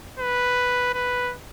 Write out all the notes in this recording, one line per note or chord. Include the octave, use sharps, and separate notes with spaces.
B4
B4